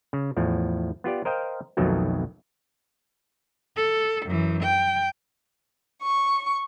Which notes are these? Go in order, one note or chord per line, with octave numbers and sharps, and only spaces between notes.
C#3
E2 A2 F3
B3 F4 G4 D5
A#4 C5 D#5 F5 G5
B1 F2 B2 D#3 F#3 A3
A4
F#2 E3
G5
C#6